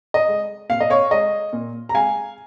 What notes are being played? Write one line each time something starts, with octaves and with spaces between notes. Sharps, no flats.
D#5
G#3
A#2 F5
D#5
C#5 F5
G#3 D#5
A#2
A#5
G#3 F5 G#5